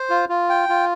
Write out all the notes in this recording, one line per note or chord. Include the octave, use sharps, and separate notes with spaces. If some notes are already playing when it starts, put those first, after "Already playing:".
Already playing: C5
F4
F4
G5
F4